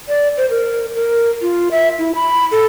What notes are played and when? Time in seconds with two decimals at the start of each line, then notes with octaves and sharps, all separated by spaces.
0.08 D5
0.37 C5
0.50 A#4
0.95 A#4
1.42 F4
1.71 E5
1.99 E4
2.15 B5
2.52 A4